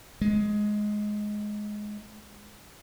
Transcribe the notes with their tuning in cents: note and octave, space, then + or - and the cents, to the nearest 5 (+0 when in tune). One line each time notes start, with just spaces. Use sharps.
G#3 +10